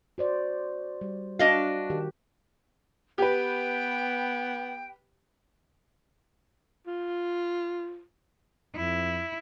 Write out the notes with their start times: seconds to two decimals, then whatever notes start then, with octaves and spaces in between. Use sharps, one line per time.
0.18 F#4 C5 D5
1.01 G3
1.39 D4 F#4 D#5 F5
1.90 D#3 G4
3.18 B3 G4 B4 G5
6.87 F4
8.76 F2 E4